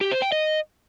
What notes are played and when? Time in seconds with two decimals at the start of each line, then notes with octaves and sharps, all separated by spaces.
0.01 G4
0.12 C5
0.22 G5
0.32 D#5